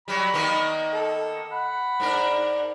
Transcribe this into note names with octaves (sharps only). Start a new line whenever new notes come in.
F#3 G3 B5
D#3 A#3 B3
A4
F#5 B5
G#2 D4 A#4